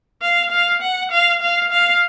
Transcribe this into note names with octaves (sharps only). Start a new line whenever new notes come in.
F5
F5
F#5
F5
F5
F5